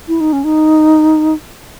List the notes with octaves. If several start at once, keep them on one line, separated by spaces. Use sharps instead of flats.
E4
D#4
C#4
D#4